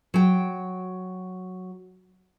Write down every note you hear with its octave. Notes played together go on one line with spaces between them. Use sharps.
F#3 G5